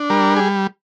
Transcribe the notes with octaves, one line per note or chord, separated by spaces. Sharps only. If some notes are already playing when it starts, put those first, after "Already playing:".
Already playing: D4
G3 A#4
G#4